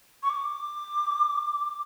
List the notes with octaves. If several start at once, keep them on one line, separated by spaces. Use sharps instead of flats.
C#6
D6